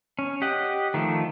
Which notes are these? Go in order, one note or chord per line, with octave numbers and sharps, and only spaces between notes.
C#4
G4 D#5 F#5
D#3 F3 A3